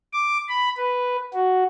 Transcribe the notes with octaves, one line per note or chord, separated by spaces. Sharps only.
D6
B5
B4
F#4